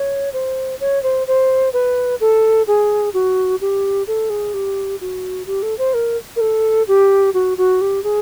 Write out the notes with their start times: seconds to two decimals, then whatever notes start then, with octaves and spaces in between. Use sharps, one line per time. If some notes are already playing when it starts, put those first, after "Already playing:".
Already playing: C#5
0.33 C5
0.80 C#5
1.03 C5
1.27 C5
1.73 B4
2.21 A4
2.67 G#4
3.14 F#4
3.61 G4
4.07 A4
4.30 G#4
4.54 G4
5.01 F#4
5.47 G4
5.62 A4
5.78 C5
5.94 A#4
6.36 A#4
6.41 A4
6.88 G4
7.34 F#4
7.58 F#4
7.81 G4
8.04 G#4